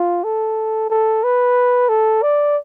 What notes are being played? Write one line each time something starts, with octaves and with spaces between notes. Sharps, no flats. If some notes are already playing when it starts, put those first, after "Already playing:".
Already playing: F4
A4
A4
B4
A4
D5